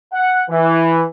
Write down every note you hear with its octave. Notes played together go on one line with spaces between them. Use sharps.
F#5
E3